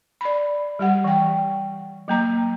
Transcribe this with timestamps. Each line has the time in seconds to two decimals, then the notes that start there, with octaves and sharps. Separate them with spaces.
0.21 D5 B5
0.79 G3 G4 F#5
1.04 E3 G5
2.08 F#3 A#3 A#5